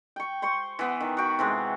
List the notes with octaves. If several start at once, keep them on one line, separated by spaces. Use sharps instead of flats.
G5 C#6
C5 C6 C#6
E3 B3
D#3
F#4 G5
C3 E3 G#3